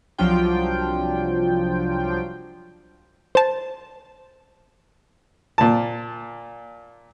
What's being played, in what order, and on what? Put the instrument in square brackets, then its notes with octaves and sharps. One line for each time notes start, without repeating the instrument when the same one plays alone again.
[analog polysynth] C2 F3 F#3 D4 F4 G5
[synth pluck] C5 A5
[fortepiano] A#2 A5